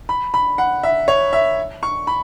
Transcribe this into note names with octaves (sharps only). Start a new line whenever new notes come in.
B5
B5
F#5
E5
C#5
E5
C#6
B5